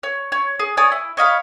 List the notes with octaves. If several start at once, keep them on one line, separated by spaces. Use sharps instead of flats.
C#5
C#5
G#4
C#5 D5 G#5 D#6
E4
C#5 D#5 F5 B5